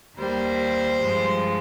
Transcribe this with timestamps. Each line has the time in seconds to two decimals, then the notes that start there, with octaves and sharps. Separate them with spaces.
0.18 D#2 D#3 G3 C5
1.04 G2 F3 G#3